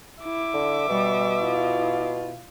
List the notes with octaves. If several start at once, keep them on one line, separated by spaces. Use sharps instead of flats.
E4 E5 D6
D3
B2 G3
E4 F4